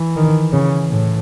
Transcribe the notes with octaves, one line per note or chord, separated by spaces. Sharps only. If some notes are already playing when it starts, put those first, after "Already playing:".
Already playing: E3
D#3
C#3
A2